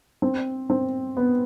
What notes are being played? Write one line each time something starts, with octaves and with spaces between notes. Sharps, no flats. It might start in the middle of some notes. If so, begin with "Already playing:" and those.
C4
C4
B3